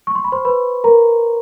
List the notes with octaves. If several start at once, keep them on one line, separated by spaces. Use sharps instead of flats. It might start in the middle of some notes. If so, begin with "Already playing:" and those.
C#6
C6
B5
C5 C6
B4 B5
A#4 A#5